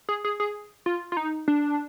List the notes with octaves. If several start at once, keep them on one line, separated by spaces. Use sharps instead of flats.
G#4
G#4
G#4
F4
F4
D#4
D4